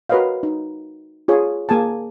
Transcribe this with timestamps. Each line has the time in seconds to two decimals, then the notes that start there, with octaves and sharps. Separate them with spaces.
0.09 F#4 A#4 B4 C#5 D#5 F5
0.43 D#4
1.28 F4 G#4 C#5
1.69 A#3 G#4 G#5 A5